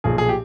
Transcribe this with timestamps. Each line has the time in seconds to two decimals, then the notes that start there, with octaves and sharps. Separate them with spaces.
0.04 B1 A#2 F3 G#4
0.18 G#4
0.29 G4